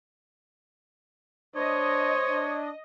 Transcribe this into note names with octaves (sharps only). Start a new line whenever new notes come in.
D4 C5 C#5 D#5
D4